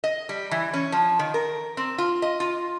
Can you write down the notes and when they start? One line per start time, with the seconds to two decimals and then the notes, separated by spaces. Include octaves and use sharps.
0.04 D#5
0.29 G3
0.51 E3
0.73 C#4
0.92 F3
1.19 D#3
1.34 A#4
1.77 C4
1.98 F4
2.22 D#5
2.40 F4